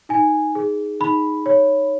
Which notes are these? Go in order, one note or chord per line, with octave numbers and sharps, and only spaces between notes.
D#4 G#5
G#4
D#4 B5
C#5